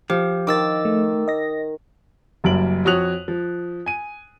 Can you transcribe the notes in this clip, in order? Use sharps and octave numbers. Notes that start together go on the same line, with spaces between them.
F3 G4
D#3 D6 E6 A6
A3
D#5 A#6
F#1 F#2 G3 D7 F#7
F2 F#4 C#5 D#6 F#6 F7
F3
G#5 D#7